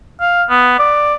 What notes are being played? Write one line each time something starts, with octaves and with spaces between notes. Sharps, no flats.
F5
B3
D5